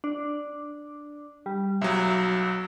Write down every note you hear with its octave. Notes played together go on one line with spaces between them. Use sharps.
D4
G3
B1 F#3 E5